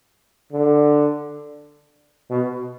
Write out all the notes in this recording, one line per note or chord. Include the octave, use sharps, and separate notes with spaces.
D3
B2